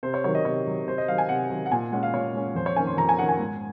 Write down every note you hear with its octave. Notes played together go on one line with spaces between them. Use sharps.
C3 C5
C#5
D#3 F#3 C#5
D#5
C3 C#5
D#3 F#3
C3 C5
D#5
D#3 F#3 F5
G#5
C3 F#5
D#3 F#3
F#5
A#2 G#5
G#3 C#4 F#5
F5
A#2 C#5
G#3 C#4
F2 C5
C#5
D#3 A#3 C#4 G#5
C6
F2 A#5
G#5
D#3 A#3 C#4 F#5
G#5
G#2